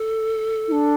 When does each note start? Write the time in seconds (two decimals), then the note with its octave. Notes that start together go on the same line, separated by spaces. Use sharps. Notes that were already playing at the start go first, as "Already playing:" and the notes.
Already playing: A4
0.68 E4
0.72 D4